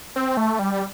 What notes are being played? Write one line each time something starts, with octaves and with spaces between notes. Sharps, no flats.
C4
A3
G3